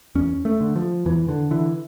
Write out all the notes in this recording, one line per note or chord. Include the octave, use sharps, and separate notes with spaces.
E2 C#4
A3
D3
F3
E2 E3
D3
D3 E3